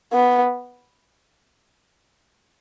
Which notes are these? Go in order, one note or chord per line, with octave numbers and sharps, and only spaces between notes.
B3